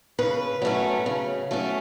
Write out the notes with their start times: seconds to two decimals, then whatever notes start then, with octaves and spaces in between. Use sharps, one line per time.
0.19 C#3 B4
0.62 F#3 A3 C#4
1.06 C#3
1.51 F#3 A3 C#4